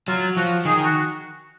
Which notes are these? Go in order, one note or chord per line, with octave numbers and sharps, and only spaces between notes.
F#3 F4
F3 F#4
D#3 G#4
F#4